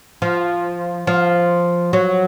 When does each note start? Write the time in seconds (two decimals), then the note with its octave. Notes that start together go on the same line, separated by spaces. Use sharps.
0.22 F3
1.07 F3
1.93 F#3